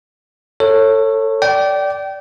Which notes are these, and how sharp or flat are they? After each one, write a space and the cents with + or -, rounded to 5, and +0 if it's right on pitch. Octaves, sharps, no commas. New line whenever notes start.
A4 +25 C#5 -15
D5 -10 G5 -25